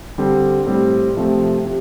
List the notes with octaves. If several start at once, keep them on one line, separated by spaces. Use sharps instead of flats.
D3 G3 C4
A2 G3 C4
C3 F3 A3 C4
C3